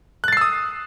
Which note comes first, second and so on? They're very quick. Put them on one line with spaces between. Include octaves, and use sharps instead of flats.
F#6 A6 C7 E6 D#6